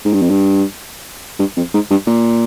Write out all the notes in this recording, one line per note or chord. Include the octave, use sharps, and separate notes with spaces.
G#2
G2
F2
G2
G2
F2
G#2
G2
A#2